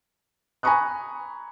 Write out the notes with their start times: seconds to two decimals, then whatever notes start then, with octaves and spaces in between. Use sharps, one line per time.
0.63 G#5 A#5 B5 C#6 D#6 F#6